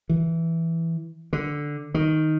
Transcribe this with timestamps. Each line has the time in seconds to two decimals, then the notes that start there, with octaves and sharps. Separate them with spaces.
0.09 E3
1.33 D3
1.94 D#3